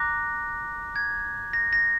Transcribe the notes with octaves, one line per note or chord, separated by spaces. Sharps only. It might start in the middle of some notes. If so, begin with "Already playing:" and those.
Already playing: A#5 D6 F#6 A#6
G#6
A#6
A#6